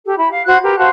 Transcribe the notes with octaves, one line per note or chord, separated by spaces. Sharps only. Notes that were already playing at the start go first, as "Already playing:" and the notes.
G4 A4
E4 B5
F5
F#4 C5 F#6 G#6
G4 A#4 B4
F#4 C5 F5 A5